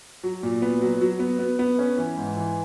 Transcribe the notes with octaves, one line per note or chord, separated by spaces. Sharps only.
F#3
A#2
B3
F#3
F#3
B3
B3
B3
C#4
E3
G#2
E3